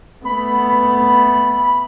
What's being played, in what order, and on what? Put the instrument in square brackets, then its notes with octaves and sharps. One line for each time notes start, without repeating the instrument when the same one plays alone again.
[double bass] A3 B3 [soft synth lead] B5